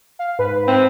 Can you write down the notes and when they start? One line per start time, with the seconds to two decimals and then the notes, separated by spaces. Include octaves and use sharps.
0.19 F5
0.39 G#2 B4
0.68 C4